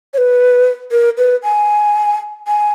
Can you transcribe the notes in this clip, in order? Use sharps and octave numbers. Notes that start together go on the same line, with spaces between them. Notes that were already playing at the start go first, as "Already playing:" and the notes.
C#5
B4
A#4
B4
G#5
G#5